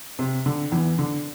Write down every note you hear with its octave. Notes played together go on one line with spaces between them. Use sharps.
C3
D3
E2 E3
D3